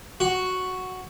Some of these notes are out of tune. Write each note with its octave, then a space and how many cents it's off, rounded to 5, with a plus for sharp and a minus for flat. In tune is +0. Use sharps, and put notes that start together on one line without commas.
F#4 +0